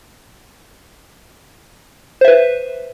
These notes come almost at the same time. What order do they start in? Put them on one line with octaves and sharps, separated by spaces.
C5 E5 B4